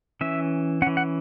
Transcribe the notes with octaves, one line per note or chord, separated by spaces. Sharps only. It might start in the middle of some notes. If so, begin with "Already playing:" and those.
E3 C#4 E5
E3 C#4 F#5
F#5